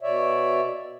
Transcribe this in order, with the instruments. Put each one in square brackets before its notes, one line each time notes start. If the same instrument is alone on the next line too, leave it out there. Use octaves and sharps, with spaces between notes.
[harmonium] B2 C#5 D5 E5